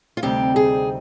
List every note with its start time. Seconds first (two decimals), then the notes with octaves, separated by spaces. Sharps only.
0.17 F4
0.22 D2 C3 G3 C4 D#4 G4
0.56 G#4